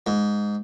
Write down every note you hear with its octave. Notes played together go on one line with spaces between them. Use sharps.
G#2